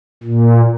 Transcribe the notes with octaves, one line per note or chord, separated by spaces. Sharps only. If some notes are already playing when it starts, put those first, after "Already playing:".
A#2